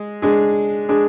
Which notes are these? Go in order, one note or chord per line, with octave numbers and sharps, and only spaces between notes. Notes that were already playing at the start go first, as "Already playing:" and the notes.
Already playing: G#3 G#4
G#3 D4 G#4
G#3 D4 G#4